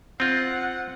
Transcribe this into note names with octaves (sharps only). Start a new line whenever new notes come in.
C4 F4 F#5